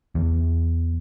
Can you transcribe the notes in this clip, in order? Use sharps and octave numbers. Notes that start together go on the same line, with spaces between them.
E2